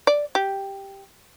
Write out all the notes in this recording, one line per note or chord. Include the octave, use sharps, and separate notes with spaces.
D5
G4